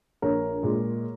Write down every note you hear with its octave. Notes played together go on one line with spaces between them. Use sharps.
A#1 A#4 C#5
A#2 G#3